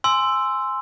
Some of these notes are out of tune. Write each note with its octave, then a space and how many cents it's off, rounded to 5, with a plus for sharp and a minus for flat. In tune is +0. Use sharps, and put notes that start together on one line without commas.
G#5 +0 C6 -5 E6 +5